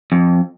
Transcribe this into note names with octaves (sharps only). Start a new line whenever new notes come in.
F2